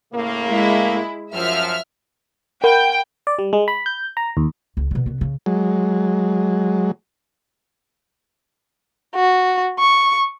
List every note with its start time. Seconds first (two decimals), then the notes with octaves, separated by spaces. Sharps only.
0.13 A2 C#3 A#3
0.49 G#3 E4
1.32 F#2 F3 E5 F6
2.64 A#4 F#5 G5 B5
3.27 D5
3.39 G3
3.53 G#3
3.68 B5
3.86 G6
4.17 A#5
4.37 D#2
4.77 C#2
4.91 B2 D3
5.06 C2 B3
5.21 C#3
5.46 F#3 G#3
9.15 F#4
9.79 C#6